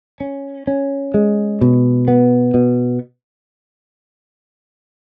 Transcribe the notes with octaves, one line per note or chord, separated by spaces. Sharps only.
C#4
C#4
G#3
B2
B3
B2